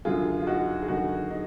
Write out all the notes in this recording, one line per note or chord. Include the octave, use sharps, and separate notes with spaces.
F#2 D3 F4 G#4
F4
D#4 F#4
G#4
F#2 D3 D#4 F#4
D#4